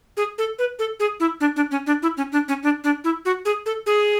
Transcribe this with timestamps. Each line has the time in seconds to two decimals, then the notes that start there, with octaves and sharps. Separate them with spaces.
0.17 G#4
0.38 A4
0.59 B4
0.79 A4
1.00 G#4
1.20 E4
1.40 D4
1.56 D4
1.71 C#4
1.87 D4
2.02 E4
2.17 C#4
2.32 D4
2.48 C#4
2.63 D4
2.84 D4
3.04 E4
3.25 F#4
3.45 G#4
3.66 A4
3.86 G#4